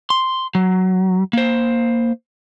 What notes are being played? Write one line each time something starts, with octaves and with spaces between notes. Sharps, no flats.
C6
F#3
A#3 C5